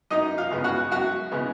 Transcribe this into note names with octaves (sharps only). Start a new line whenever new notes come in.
F#2 D#4 D#5
F4 F5
C#3 G#3 B3
F#4 F#5
F#2 F#4 F#5
C#3 G#3 B3